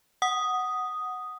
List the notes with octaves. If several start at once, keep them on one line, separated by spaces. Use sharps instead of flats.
F#5 D#6